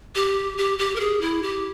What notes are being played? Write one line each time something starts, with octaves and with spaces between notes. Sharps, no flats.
G4
G4
G4
A#4
G#4
E4
G4